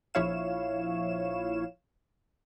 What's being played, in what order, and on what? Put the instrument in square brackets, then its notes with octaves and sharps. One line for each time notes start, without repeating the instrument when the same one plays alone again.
[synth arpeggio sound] A#1 F3 E4 C#5 F5 E7